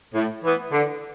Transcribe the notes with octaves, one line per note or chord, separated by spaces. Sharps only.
A2
E3 B3
D3